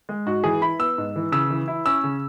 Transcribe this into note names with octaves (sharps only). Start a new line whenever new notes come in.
G#3
G#2 F#4
E3 G#4
E4 B5
B3 E6
G#2
E3
C#3 E6
E3
E4
C#4 E6
C#3